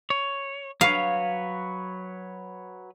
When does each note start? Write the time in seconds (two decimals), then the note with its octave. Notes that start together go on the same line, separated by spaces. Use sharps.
0.10 C#5
0.81 F#3 B4 C#5 F5